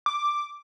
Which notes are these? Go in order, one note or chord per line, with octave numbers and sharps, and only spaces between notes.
D6